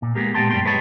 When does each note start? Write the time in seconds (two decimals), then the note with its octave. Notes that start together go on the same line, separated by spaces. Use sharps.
0.02 A#2
0.15 G#3 A#3 B3 G4 G#4 A#4
0.34 A#2 G#3 B3 G5 A5 C6
0.51 F#2 G3 A3 F5 G5 C6
0.65 G#4 B4 C#5 D#5 A5